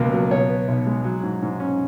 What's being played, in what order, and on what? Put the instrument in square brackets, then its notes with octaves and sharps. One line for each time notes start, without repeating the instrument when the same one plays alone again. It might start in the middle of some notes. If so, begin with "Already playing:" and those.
Already playing: [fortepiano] C#2 B2 F3 A#3
F#3
B2 C#5
B3
B1
G#3
F#3
G#2
G#2
C#4